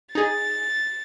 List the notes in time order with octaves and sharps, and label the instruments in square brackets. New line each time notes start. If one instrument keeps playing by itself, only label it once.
[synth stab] D#4 G#4 [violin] A6